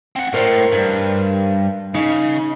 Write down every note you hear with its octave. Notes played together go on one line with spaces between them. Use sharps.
C4 F#5
A2 A#4 C5
G2
C#3 D#4